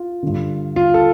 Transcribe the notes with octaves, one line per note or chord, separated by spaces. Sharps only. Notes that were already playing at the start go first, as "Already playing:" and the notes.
Already playing: F4
G2 D3
F4
A4